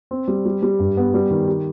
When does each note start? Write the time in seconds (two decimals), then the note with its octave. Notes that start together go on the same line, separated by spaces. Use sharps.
0.11 C4
0.28 G3
0.45 G3
0.63 G3
0.79 G2
0.97 B3
1.14 G3
1.31 D#3
1.47 G4